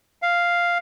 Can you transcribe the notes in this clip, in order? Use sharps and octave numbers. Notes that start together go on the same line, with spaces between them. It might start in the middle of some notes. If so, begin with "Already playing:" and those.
F5